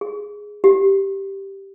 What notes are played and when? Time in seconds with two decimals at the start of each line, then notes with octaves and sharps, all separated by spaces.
0.01 G#4
0.64 G4